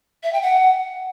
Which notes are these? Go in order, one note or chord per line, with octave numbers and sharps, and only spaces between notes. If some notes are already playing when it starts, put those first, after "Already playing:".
E5
G5
F#5